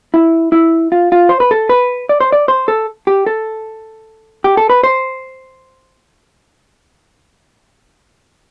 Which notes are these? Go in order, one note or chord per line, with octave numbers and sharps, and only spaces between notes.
E4
E4
F4
F4
C5
B4
A4
B4
D5
C5
D5
C5
A4
G4
A4
G4
A4
B4
C5